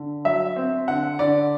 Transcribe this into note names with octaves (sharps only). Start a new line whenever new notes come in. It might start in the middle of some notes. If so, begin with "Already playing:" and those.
Already playing: D3
F#3 E5
C4
D3 F#5
D3 D5